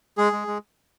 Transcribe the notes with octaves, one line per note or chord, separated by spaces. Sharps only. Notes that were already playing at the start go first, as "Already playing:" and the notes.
G#3 G#4
G#3
G#3